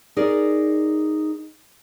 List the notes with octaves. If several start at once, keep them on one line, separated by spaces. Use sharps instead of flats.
D#4 G#4 A#4 D5